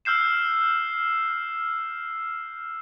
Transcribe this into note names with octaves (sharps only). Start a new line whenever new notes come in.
E6 F6 G6 C7 E7